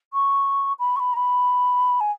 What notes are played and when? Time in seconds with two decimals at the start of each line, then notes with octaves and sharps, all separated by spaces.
0.13 C#6
0.79 B5
0.96 C#6
1.00 B5
1.13 A#5
1.17 B5
2.00 G#5